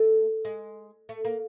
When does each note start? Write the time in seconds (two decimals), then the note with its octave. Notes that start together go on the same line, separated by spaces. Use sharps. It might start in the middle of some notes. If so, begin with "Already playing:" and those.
Already playing: A3
0.45 G#3
1.09 A3
1.25 A#3